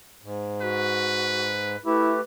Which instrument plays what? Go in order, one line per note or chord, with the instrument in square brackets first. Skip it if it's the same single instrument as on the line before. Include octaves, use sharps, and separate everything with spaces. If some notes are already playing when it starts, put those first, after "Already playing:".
[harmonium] G#2
[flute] F#4 [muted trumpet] B4
[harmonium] A3 G4 [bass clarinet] E4 [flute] B4